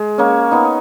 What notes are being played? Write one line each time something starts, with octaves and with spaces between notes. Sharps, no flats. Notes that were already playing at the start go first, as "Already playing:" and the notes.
Already playing: G#3
A#3 C#4
B3 D#4